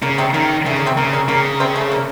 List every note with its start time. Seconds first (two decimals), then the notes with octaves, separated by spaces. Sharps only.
0.02 C#3 A#3
0.18 C3 C4
0.34 D#3 A#3
0.65 C#3 A3
0.76 A#3
0.86 C3 C4
0.97 C#3 A#3
1.13 A#3
1.28 C#3 A#3
1.60 C3 C4
1.76 A3
1.92 A#3